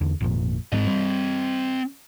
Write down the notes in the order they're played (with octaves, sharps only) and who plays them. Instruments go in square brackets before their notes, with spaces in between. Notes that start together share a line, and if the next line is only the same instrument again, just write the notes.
[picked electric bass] E2 D3
G#1 F2 A#2
[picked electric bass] G#2 G3 G#3 [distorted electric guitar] C4 D#5
[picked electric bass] G3